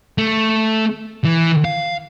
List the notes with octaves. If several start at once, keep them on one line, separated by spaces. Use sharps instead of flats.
A3
E3
F5